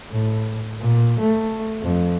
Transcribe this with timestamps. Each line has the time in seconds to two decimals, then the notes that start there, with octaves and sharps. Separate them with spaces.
0.10 A2
0.79 A#2
1.19 A3
1.82 F2